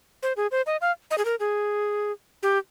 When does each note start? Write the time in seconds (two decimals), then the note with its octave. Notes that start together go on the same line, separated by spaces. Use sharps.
0.23 C5
0.37 G#4
0.51 C5
0.66 D#5
0.81 F5
1.11 D#5
1.18 G#4
1.25 A#4
1.40 G#4
2.43 G4